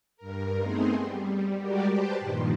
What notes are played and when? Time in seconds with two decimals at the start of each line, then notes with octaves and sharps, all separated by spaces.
0.17 G2 A#4
0.60 A3 B3 C4 D#4 G#4 C5
1.01 G3
1.58 G3 G#3 F#4 G4 A#4 D5
1.90 G4 B4 C5 G5 A5
2.19 G2 A#2 D#3 F3